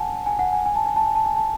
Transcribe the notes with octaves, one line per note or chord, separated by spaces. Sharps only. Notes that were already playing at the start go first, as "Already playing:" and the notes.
Already playing: F#5 G#5 A5
G#5
F#5
G#5
G#5
A5
G#5
A5
G#5
A5
G#5
A5